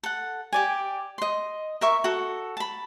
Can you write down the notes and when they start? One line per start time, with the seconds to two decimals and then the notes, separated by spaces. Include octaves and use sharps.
0.03 A4 F#5
0.53 G4 D5 G#5
1.18 D#5 C6
1.81 A#4 E5 C#6
2.04 F#4 A4
2.57 A5 B5